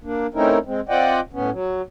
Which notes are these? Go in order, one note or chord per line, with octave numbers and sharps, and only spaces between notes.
A#3 D4
A3 C4 C#4 D#4 E4 A#4
G#3 C4
C4 F4 D5 D#5 F#5 G5
A2 B3 C#4
F#3